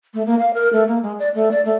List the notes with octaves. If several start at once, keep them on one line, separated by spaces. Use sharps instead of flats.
A3
A#3
F5
A#4
A3
A#3
G#3
D5
A3
D5
A3